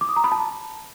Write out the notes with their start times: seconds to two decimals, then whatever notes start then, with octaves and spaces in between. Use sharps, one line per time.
0.01 D6
0.09 D#6
0.16 A#5
0.24 B5
0.32 A5